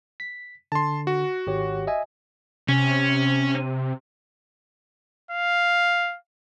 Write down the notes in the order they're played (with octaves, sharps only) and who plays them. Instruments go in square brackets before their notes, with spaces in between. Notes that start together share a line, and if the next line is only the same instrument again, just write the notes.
[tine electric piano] B6
[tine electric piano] D3 [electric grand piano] A5 C6
[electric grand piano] F#4
[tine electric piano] G#1 G4 C#5
D#5 E5 G#5
[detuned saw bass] C3 [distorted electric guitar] C#4
[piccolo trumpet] F5